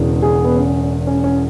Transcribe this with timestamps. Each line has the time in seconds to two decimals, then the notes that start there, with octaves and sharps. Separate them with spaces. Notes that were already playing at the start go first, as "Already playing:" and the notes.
Already playing: E1 E2 C#3 E3
0.22 G#4
0.44 B3
0.56 C#4
1.07 C#4
1.24 C#4